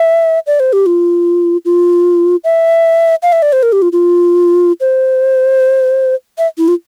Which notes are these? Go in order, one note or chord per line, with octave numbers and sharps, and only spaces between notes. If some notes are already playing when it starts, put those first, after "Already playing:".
Already playing: E5
D5
C5
G4
F4
F4
E5
F5
E5
D5
C5
A#4
G4
F4
F4
C5
E5
E4
F4